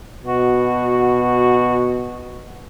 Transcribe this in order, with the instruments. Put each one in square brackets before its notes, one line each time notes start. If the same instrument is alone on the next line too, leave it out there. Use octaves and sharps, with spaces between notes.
[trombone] B2 [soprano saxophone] F#4